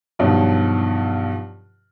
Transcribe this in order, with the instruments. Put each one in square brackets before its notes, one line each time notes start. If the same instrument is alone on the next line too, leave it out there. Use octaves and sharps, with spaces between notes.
[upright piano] G2 B2 D#3 F3 F#3